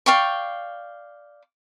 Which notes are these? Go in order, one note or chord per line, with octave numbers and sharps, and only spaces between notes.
D5 F5 G5 C#6